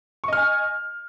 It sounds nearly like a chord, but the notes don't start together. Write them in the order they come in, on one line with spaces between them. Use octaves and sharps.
C#6 D#5 F6 G#5